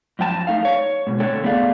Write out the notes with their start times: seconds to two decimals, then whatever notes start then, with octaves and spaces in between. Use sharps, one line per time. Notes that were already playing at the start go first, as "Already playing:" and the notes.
0.19 F#2 F3 G5 A5
0.47 A3 D#4 F5
0.65 C#5
1.07 G#2 B2
1.20 A2 D3 A4 C#5 G5
1.44 A3 B3 G#4 D5 F5